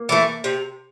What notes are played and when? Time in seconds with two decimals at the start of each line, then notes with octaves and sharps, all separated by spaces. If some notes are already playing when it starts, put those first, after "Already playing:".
Already playing: A#3
0.09 E3 A3
0.44 C3